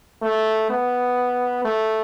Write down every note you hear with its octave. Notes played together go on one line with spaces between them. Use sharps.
A3
B3
A3